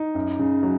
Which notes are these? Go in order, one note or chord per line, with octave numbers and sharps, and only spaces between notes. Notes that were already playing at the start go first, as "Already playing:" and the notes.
Already playing: D#4
F#2
C#3
F#3